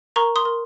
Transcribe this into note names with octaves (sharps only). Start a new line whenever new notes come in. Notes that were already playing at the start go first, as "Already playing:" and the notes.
A#4 A#5 C#6
C6 D#6
A#4